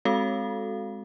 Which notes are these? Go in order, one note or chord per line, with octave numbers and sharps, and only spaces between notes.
G#3 C4 F#4 A4 F5